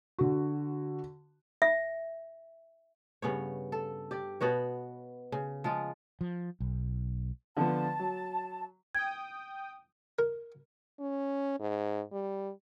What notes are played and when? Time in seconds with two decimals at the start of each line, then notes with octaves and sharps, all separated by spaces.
0.18 D3 F#4
1.62 E5
3.22 G2 C#3 B3 C#5
3.72 A4
4.11 G4 D5
4.41 B2 B3 F#4 C#5
5.32 C#3
5.64 F3 G#3 F4
6.21 F3
6.60 B1
7.57 D3 F3 B3 A5
7.99 F#3
8.95 G5 D#6 G#6
10.19 A#4
11.00 C#4
11.60 G#2
12.12 G3